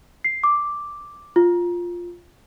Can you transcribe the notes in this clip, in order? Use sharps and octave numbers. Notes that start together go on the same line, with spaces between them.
C7
D6
F4